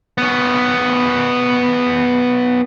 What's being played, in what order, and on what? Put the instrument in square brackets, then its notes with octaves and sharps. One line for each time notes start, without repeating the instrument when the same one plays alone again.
[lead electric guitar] B3 C#4